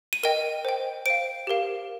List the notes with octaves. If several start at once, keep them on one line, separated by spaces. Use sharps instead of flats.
D#7
A#4 D#5 G5 D#7
C5 G5
C5 F5 D7
G4 A#4 F5